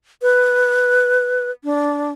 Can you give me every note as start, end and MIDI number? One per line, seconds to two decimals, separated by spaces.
0.22 1.51 71
1.64 2.12 62